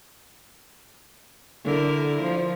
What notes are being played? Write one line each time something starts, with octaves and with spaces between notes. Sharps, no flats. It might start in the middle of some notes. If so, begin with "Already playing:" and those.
D3 E4 A#4
F3